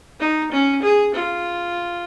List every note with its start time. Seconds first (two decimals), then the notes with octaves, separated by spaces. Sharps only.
0.20 D#4
0.52 C#4
0.83 G#4
1.14 F4